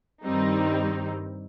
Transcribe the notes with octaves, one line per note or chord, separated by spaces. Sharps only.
G2 D#3 G3 C4 D#4